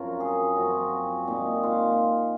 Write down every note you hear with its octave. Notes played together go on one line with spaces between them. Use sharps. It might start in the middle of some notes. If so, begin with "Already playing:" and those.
Already playing: F#2 F3 C4 A#4
G#4
F#2 F3 C4 F#4
A#2 G#3 C4 D#4
F4